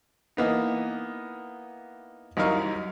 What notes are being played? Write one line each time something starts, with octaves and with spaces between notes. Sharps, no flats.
E3 A#3 B3 D#4
C2 F#2 D#4 A#4 F5 C#6